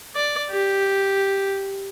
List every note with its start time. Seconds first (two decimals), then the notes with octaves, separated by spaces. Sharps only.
0.15 D5
0.50 G4